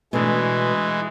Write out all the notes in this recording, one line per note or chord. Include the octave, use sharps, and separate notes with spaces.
B2 E3 G#3 A3 D4